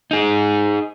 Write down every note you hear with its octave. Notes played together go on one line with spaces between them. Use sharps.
D#4 G#4